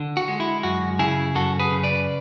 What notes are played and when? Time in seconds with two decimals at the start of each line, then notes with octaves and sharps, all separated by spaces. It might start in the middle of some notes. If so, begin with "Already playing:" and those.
Already playing: D3
0.17 F#4
0.28 G#3
0.40 E4
0.63 F#2 F#4
0.99 C#3 E4 G#4
1.35 F#2 F#4 A4
1.59 G#4 B4
1.71 C#3
1.83 B4 D5